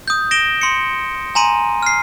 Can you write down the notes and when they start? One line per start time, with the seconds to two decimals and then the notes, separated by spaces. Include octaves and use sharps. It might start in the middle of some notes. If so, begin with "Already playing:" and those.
0.08 D#6 G6
0.31 A#6 D7 E7 G7
0.61 C6 C#7
1.35 G#5 A#5 C6 D#7
1.83 F6 C7